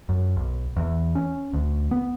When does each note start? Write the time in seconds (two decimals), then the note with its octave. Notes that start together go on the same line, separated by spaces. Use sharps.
0.09 F#2
0.37 B1
0.77 E2
1.15 C#4
1.53 D2
1.91 B3